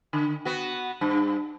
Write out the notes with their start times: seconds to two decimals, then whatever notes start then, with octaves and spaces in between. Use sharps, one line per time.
0.13 D3
0.45 B3 F#4
1.01 G2